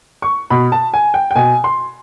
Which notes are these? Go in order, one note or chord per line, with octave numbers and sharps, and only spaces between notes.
C#6
B2 B5
A5
G#5
G5
G5
B2 G#5
C6